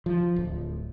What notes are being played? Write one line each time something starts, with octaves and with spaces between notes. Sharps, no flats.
F3
D1